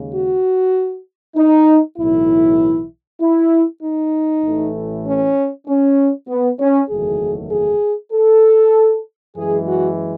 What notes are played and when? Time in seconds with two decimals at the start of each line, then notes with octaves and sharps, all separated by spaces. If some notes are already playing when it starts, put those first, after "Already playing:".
Already playing: D#2 C#3 G#3
0.13 F#4
1.36 D#4
1.98 B1 A2 E3 E4
3.21 E4
3.82 D#4
4.43 A1 A2 E3 A3
5.06 C#4
5.67 C#4
6.28 B3
6.59 C#4
6.89 F#1 E2 D#3 F#3 A3 G#4
7.51 G#4
8.13 A4
9.36 F#2 E3 G#3 G#4
9.67 F#4